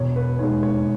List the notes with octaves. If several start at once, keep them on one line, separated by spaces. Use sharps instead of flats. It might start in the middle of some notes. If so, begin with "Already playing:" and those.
Already playing: E1 C#5
B4
D#2 D#3 G#3 C#5
C#5